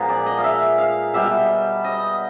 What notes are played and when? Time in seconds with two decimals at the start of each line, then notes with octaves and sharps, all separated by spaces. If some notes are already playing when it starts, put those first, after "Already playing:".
Already playing: A#2 F3 G#3 B3
0.09 D5
0.26 D#5
0.38 F5
0.44 E5
0.78 F5
1.14 B2 G3 B3 E5
1.84 D#5